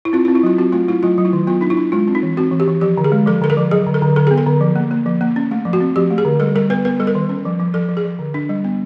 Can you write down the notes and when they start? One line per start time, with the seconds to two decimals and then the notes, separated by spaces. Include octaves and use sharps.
0.05 E4
0.13 C4 F4
0.25 E4
0.28 C4
0.35 E4
0.43 F#3 F4
0.58 C4 F#4
0.72 A3 F4
0.88 A3 E4
1.03 F#3 F4
1.18 F#3
1.25 E4
1.33 D#3
1.47 B3 F4
1.61 D4 D#4
1.70 E4
1.77 D4
1.92 G#3 F4
2.08 C4
2.15 D#4
2.23 E3
2.37 C4 F#4
2.52 E3
2.60 G4
2.68 E3
2.81 F3 G4
2.98 D3
3.04 G#4
3.12 G#3
3.26 F3 A4
3.41 D3 A4
3.50 A#4
3.57 F3
3.71 F#3 G#4
3.86 D3
3.94 A4
4.02 D3
4.16 D3 A4
4.27 B3 G#4
4.38 A4
4.47 D3
4.61 F3
4.76 A#3
4.91 A#3
5.06 F3
5.21 A#3
5.36 C#4
5.51 A3
5.65 F3
5.73 F#4
5.80 C4
5.96 F3 G4
6.10 A3
6.18 G#4
6.25 D3
6.40 G3 A4
6.55 G3 A#4
6.70 B3 B4
6.85 B3 B4
7.00 G3 A4
7.07 A#4
7.15 D#3
7.29 C#4
7.45 F3
7.60 F3
7.74 F3 A4
7.89 F3
7.97 G#4
8.05 F3
8.19 D3
8.34 D4
8.49 G3
8.64 B3